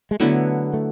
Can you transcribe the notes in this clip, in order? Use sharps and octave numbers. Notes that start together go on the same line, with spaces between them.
G#3
D3 F#3 A3 B3 E4
A3